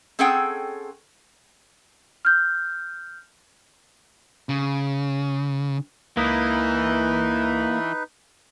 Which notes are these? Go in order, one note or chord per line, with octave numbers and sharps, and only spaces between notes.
C4 C#4 G#4 A4 F#5 G5
F6 G6
C#3
C#2 E3 A#3 D#4 B4 D#6 B6